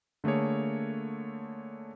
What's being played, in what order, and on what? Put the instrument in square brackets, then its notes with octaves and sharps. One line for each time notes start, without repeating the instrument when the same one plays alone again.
[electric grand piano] D3 A3 A#3 G#4 C#5